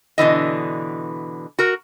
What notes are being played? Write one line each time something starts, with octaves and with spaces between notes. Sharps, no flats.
B2 D3 E3 D#5
F#4 A#4